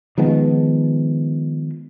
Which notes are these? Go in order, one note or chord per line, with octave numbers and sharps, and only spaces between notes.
D#3 F3 G#3 B3